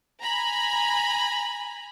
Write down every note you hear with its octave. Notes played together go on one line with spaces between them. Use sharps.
G#5 A#5 B5